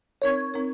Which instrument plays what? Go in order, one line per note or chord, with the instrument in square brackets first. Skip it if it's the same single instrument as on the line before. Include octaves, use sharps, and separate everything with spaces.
[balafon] C4 D#4 A#4 [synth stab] C#5
[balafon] C4 D#4 A#4